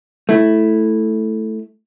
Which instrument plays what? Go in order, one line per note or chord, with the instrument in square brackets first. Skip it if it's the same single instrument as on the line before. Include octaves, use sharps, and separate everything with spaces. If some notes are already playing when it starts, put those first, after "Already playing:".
[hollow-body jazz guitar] A3 E4